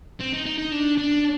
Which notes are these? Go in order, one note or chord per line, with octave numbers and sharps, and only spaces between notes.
C4
D#4
D#4
D#4
D4
D4